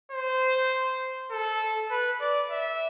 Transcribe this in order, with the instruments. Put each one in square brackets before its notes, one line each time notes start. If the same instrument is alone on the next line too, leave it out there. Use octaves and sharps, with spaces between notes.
[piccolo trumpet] C5
A4
B4
D5
E5